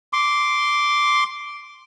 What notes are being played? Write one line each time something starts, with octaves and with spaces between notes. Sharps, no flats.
C6 D6